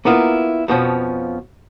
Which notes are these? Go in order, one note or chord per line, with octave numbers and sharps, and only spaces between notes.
A#3 B3 E4 F4 A#4
F2 B2 F3 C#4